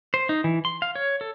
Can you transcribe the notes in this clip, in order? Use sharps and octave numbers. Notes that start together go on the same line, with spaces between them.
C5
D#4
E3
C6
F5
C#5
A4